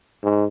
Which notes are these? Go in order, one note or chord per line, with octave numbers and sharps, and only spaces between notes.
G#2